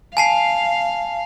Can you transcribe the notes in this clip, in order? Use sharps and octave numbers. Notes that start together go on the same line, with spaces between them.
F5 G#5 A5 C7